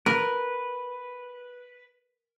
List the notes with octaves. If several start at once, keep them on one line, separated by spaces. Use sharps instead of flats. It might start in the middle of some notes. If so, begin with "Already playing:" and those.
A#4 B4